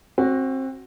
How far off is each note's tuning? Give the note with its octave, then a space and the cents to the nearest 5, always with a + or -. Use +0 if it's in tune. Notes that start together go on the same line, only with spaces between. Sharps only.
C4 +25 F#4 +0